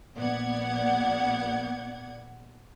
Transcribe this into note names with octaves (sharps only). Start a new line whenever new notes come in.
A#1 B3 D5 F#5 G#6